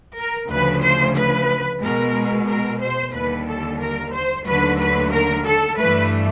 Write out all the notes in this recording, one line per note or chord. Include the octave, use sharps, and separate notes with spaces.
A#4
D2 C#3 F3 B4
C5
B4
B2 G#3 A#4
A#4
C5
D#2 D3 G3 B4
A4
A#4
C5
D#2 D3 F#3 A3 B4
B4
A#4
A4
G2 E3 A3 B4